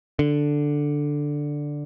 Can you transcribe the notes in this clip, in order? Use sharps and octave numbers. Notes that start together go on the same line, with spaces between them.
D3